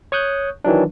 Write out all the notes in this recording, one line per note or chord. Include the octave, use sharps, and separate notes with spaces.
C#5 C#6 D#6 F#6 G6
D#3 E3 F#3 D4